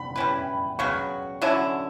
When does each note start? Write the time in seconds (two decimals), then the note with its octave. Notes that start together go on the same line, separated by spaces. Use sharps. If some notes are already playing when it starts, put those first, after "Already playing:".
Already playing: B5
0.16 G3 C#4 E4 B4
0.79 C#3 F#3 B3 F#4 C#6
1.42 D3 F#3 C#4 E4